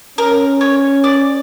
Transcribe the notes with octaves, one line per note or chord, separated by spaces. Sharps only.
C#4 A#4
C#5
D5